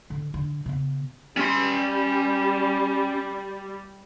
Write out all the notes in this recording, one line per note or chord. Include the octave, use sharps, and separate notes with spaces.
D3
D3
C#3 B3
G3 C#4 C6